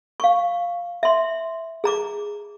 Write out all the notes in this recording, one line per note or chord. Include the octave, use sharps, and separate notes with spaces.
F5 C#6
E5 C6
G#4 A#5 D6